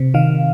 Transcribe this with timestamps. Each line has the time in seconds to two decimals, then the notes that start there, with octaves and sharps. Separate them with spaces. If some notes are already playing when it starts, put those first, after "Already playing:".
Already playing: C3
0.14 D#3 F5